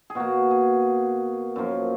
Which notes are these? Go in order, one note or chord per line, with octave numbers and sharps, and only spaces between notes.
G#4
B2 A#3 F#4
G#4
F#2 F3 A#3